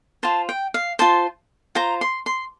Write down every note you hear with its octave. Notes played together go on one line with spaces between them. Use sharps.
F4 C5 A5
G5
F5
F4 C5 A5
F4 C5 A#5
C6
C6